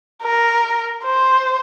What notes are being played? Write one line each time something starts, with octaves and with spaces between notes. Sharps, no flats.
A#4
C5